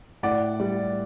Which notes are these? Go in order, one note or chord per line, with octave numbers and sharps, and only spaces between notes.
A2 D5 F#5
G3